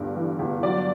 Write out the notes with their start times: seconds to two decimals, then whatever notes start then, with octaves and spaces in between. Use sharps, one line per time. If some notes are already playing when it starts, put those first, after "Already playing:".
Already playing: G1 G2
0.16 E3
0.39 G1
0.63 F#3 D5